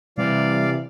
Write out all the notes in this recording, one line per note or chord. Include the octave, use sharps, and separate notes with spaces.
C3 E3 G3 D5 F5